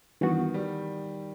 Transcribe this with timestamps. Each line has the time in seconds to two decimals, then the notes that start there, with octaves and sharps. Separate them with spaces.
0.21 G2 D#3 E3 B3 F#4
0.54 G3